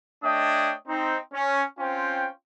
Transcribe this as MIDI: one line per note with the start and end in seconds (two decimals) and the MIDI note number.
0.23 0.73 57
0.23 0.73 62
0.23 0.73 73
0.23 0.73 75
0.23 0.73 79
0.23 0.73 87
0.88 1.17 60
0.88 1.17 63
1.33 1.63 61
1.79 2.29 60
1.79 2.29 61
1.79 2.29 65
1.79 2.29 72
1.79 2.29 79